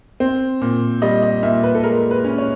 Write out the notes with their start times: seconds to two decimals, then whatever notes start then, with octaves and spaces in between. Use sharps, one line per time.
0.20 C4
0.62 A#2
1.02 G3 D#5
1.22 D#5
1.43 A#2 E5
1.64 B4
1.75 A4
1.83 G#3 A#4
2.11 B4
2.25 C#4
2.38 C#5